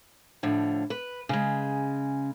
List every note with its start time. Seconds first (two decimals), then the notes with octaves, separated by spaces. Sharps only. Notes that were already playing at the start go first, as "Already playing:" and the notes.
0.43 A2 D3 F3
0.90 B4
1.29 C#3 G#3